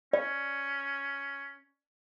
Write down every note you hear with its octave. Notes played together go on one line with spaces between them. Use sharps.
C#4 D5